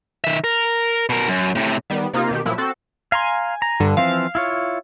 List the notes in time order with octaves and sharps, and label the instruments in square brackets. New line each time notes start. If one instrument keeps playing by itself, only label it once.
[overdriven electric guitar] D#3 E5
A#4
B2 A#4
F#2
A2 C3
[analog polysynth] D#3 G3 B3
C3 A#3 D#4 F4
B2 D#3 G4
A#2 F3 F#3 E4
C4 F#4 A4
[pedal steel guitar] F5 A#5 C6 [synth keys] G#5
[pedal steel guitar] A#5
[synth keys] G2 D3
[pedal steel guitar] E3 F3 C4 [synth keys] F5
[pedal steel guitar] E4 F4 C#5